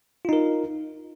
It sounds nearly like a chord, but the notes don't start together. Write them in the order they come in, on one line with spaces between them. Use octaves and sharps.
F4 D#4 A#4